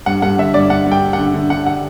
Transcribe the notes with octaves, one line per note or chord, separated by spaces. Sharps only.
G2 F#5
G2 F#5
D3 E5
G2 D5
G2 F#5
G2
G5
G2
F#5
D3
D3
D3 F#5
F#5